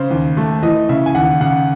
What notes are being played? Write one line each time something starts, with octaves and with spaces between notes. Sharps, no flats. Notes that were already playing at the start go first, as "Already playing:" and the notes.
Already playing: C#3 C5
D#2
A3
E3 D#5
C#3 E5
G#5
D#2 F#5
C#3 F#5